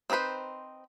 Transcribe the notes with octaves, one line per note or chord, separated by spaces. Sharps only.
C4 D#4 G#4 B4 C5